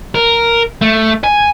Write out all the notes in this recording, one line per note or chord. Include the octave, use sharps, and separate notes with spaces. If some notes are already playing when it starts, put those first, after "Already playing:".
A#4
A3
G#5